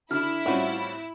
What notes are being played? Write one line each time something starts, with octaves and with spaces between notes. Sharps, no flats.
D3 E4 F6
A2 G3 C4 C#4 F4 F#4